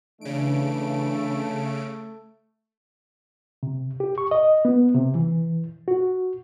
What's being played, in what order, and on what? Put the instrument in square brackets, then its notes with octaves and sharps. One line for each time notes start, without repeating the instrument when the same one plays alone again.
[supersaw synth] C#3 D7 [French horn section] E3 D4 [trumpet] A3
[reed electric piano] C3
G4
C#6
D#5
B3
C3
E3
F#4